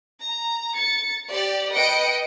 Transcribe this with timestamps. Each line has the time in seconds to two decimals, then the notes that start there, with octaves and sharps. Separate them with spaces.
0.24 A#5
0.75 A6 C#7
1.29 G4 D5
1.72 B4 D#5 G5 C#7 D7